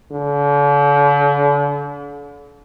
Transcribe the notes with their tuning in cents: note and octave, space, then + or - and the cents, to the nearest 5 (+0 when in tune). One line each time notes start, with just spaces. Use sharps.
D3 -40